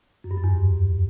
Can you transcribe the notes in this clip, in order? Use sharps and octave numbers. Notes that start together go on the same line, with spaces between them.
F#2
G2
F#2
E2
G#2